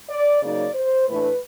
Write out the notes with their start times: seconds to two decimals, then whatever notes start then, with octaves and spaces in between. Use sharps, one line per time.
0.08 D5
0.42 C#3 F#3 A#3 D#4 D5
0.74 C5
1.07 A2 E3 A3 D4 B4